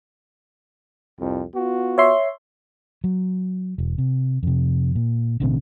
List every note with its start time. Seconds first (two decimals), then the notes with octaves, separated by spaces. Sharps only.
1.19 C2 F2
1.55 B3 F4 F#4
1.98 C#5 E5 C6
3.04 F#3
3.78 E1
3.98 C3
4.43 F2 C3
4.96 A#2
5.40 A1 B2 D3 C4